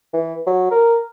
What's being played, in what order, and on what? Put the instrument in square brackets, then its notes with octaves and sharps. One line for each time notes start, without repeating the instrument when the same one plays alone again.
[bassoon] E3
F#3
A#4